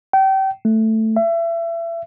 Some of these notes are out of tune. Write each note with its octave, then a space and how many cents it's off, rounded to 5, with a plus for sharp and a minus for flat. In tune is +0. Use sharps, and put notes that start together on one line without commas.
G5 -30
A3 +5
E5 +30